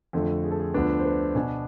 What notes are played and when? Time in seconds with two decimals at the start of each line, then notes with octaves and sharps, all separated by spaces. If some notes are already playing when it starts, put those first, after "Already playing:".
0.13 F2 D3 A3 F4
0.44 G#4
0.51 A4
0.60 G#4
0.74 D2 D3 F3 B3 D4 B4
1.00 C5
1.05 B4
1.35 B2 B3 D4 G#5